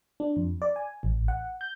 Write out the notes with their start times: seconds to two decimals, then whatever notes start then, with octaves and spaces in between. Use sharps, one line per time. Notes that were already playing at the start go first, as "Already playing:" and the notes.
0.20 D4
0.36 F2
0.62 D5
0.76 G#5
1.03 A1
1.28 F#5
1.61 G6